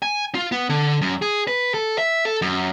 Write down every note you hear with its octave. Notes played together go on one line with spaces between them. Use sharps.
G#5
F4
B3
D3
F#2
G#4
B4
A4
E5
A4
F#2